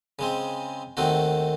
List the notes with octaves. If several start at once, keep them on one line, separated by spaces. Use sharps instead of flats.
C#3 G#3 C4
D#2 D#3 A3 C4 F#4